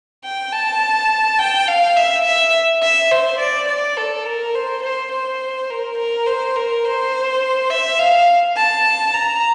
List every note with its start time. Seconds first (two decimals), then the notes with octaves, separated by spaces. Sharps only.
0.24 G5
0.53 A5
1.39 G5
1.68 F5
1.97 E5
2.25 E5
2.83 E5
3.11 C5
3.40 D5
3.69 D5
3.97 A4
4.26 A#4
4.55 C5
4.83 C5
5.12 C5
5.70 A#4
5.98 A#4
6.27 C5
6.56 A#4
6.85 C5
7.70 E5
7.99 F5
8.57 A5
9.14 A#5